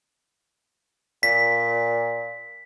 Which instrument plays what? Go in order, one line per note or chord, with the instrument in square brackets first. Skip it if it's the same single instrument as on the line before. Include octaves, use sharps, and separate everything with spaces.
[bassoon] A#2 [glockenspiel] B6